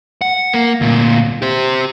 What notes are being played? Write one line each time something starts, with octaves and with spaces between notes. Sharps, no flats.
F#5
A#3
D2 A#2
G4 C5